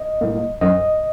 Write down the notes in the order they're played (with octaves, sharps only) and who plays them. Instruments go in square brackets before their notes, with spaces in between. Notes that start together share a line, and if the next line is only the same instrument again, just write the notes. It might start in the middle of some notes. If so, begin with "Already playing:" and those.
Already playing: [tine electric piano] D#5
A2 G3 A#3
F#2 D#5